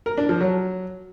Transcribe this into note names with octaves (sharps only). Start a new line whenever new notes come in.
A#4
D4
F3
F#3